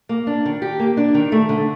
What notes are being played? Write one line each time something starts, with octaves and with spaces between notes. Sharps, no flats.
A#3
D4
D#3
G4
A#3
D4
D#3
A3
D3